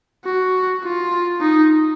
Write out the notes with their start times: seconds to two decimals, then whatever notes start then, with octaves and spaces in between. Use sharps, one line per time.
0.25 F#4
0.83 F4
1.41 D#4